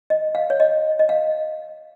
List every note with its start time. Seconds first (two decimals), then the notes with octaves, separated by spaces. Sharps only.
0.10 D#5
0.35 F5
0.50 C#5
0.60 D#5
0.99 D#5
1.09 F5